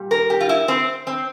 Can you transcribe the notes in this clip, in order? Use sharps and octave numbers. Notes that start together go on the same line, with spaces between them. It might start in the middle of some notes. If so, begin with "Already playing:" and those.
Already playing: A#2 G3
A#4
G4
F4
E4
C4
C4